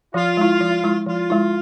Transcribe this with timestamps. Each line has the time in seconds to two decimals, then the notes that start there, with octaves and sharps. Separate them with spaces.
0.14 F3 F4
0.37 G#3 E4
0.60 F3
0.84 G#3 E4
1.06 F3 F4
1.30 G#3 E4